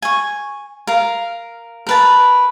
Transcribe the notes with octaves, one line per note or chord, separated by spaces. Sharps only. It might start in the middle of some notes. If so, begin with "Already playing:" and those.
G#5 C#6
A#4 F5
A#4 B4 A5